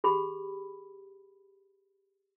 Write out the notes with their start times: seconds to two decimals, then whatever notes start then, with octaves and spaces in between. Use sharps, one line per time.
0.04 G4 G#4 B5